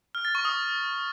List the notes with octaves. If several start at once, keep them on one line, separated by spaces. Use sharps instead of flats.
F6
A6
C#6
D#6